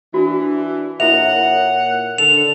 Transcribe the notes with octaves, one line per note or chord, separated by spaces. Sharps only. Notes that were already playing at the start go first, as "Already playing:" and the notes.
E3 D4 F#4 A#4
A#2 E4 A4 A#4 C#5 E5 F#5 F7
D3 A4 F7